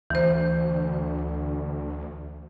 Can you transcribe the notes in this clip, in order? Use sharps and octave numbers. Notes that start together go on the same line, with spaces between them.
D2 E3 C5